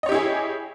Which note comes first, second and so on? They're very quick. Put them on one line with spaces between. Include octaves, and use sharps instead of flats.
D#5 C#5 G4 E4 G#4